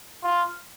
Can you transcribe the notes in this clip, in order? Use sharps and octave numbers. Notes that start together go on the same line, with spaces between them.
F4